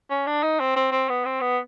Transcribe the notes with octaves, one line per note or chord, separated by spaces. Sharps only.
C#4
D4
D#4
C4
C4
C4
B3
C4
B3